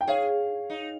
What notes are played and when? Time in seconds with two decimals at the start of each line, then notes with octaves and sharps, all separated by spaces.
0.01 G5
0.07 G#4 C#5 F5
0.70 D#4